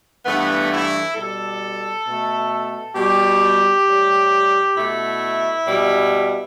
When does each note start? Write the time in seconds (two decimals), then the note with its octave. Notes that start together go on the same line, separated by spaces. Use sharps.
0.24 G2 E3 A3 B3
0.69 E4
1.14 B2 G3 A4
2.05 B2 A3
2.95 B2 G3 G4
3.85 A2 G3
4.75 B2 A3 E4
5.65 B2 G3